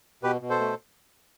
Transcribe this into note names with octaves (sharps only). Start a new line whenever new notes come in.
B2 G4 B4
B2
A4 C5
A3